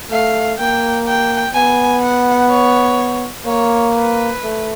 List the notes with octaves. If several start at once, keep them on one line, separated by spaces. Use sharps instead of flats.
A3 F5
A#3 G5
G5
B3 G#5
F#5
C#5
A#3 C#5
B4
A3